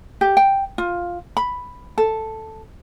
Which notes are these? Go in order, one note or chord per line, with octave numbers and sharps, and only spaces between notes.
G4
G5
F4
B5
A4